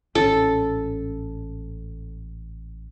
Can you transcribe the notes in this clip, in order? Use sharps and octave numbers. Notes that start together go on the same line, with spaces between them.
A1 G#2 C#4 A4